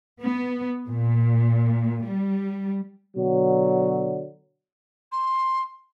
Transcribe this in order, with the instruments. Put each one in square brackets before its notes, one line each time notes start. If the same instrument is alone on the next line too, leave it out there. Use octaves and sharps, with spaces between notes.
[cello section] B3
A#2
G3
[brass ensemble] B2 D3 F#3
[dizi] C6